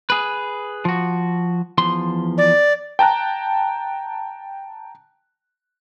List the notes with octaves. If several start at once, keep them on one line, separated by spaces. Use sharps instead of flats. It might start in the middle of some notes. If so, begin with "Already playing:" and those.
G#4 B4
F3 F#4
E2 F3 C6
D5
G5 A5 A#5 F#6